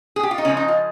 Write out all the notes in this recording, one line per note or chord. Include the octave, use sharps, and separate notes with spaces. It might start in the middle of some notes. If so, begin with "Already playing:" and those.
G#4
G4
F4
D#4
C#3 F3 G#3 C#4
D#4
F4